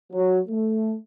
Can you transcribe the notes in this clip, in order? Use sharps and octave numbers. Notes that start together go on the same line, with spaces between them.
F#3
A3